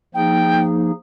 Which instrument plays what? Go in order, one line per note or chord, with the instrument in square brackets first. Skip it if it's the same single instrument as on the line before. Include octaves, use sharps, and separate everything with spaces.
[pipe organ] F3 A#3 D#4 G#4 [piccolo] G5